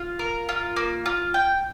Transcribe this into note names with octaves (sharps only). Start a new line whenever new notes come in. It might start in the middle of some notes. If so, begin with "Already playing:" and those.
Already playing: F4
A#4
F4
A#3
F4
G5